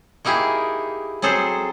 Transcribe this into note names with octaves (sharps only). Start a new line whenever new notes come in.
A#3 D#4 E4 G4 G#4
F#3 C4 G#4 A4 C5